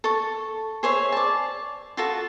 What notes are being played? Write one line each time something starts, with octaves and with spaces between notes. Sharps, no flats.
A4 C#6
G#4 C5 C#5 E5
D5 A5
F4 F#4 A4